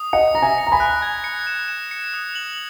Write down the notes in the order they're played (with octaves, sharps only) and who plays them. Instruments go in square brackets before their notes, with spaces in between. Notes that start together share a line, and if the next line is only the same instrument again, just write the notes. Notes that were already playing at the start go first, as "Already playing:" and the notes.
Already playing: [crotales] D#6
[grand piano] D#5 F#5 [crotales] C#7
[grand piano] A#5 [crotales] A#6
[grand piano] E5 G#5
[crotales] C#7
[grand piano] A#5
G#5 B5
[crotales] F#6
G#6
C#7
E7
E7
C#7
D#6
F#7